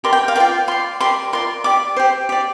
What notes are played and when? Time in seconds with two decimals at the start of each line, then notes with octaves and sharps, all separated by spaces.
0.04 G4 A#4 D5 C6
0.13 G5
0.28 F5
0.36 A#4 D5 G5
0.40 F4
0.68 F4 D5 C6
1.00 G4 A#4 D5 C6
1.33 F4 A#4 D5 C6
1.64 G4 D5 D6
1.96 G4 C5
2.29 G4 D5